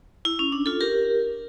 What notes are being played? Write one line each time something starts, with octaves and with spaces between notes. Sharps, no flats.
E4
C#4
D4
F4 A4
G4 A#4